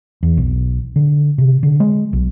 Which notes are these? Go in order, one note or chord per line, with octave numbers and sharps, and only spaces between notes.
E2
B1
D3
C3
D3
G#3
B1